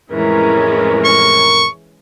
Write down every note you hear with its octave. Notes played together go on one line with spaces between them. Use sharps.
F2 A2 E3 G#3 C#4 A#4
C#6